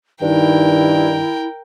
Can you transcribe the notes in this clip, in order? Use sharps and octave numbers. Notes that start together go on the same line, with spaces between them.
G2 D#3 E4 A#4 G5